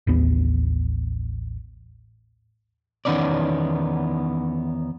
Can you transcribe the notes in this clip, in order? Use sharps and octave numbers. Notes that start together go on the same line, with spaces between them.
A1 D#2 B3
E2 D#3 B3 C#4 D#4 D5